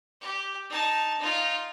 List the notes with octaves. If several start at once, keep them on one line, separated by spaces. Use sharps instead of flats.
G4
D#4 A5
D#4 F4